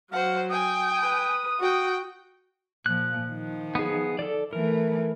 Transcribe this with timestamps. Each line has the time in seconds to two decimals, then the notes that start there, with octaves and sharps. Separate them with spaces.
0.12 F#3 C5 F5 F#5
0.51 G5 G#5 D#6
1.00 B4
1.60 F#4 F#5 G5
2.86 A#2 F3 F#6
3.30 D#3 F3
3.75 B3 G#4
4.19 A4 D5
4.53 E3 A3 A#4